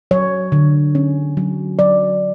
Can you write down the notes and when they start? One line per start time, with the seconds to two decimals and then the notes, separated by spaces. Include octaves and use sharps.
0.11 F#3 C#5
0.52 D3
0.95 C#4
1.37 F#3
1.79 F#3 D5